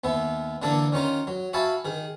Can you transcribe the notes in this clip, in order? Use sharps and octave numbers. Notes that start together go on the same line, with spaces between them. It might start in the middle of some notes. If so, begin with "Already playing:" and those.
D#2 B3 E5
D3 E3 A#3 D4 A4
D#3 C#4 F4 A#5
F#3
F#4 E5 F5 G#5 A5 B5
D#3 G#4